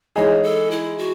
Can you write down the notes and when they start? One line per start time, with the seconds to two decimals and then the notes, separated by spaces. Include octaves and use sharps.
0.16 E3 G#3 D#4 G#4 C#5
0.43 A4
0.71 E4
0.99 F#4